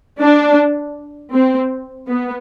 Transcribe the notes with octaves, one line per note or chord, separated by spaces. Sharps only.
D4
C4
B3